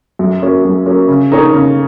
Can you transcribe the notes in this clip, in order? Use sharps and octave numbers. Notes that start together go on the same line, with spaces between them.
F#2
F#3 A#3 C#4
F#2
F#3 A#3 C#4
C#3
A#3 D#4 G#4 C#5
C#3